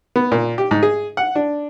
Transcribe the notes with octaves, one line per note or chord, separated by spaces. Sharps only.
B3
A#2
G4
G#2
G#4
F#5
D4